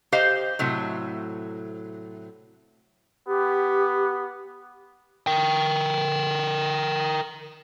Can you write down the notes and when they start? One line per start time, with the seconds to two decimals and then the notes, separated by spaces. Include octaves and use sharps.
0.12 G4 C5 D#5 F5
0.59 A2 C3 F#3
3.27 B3 G4
5.27 A#4 G5